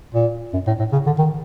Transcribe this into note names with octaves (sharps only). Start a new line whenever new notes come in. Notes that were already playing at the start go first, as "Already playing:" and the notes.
A#2
F#2
A2
A2
C#3
D3
D#3